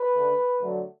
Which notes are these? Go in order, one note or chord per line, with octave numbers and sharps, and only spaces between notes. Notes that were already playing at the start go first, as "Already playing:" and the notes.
Already playing: B4
D3 A3
D3 F#3 A3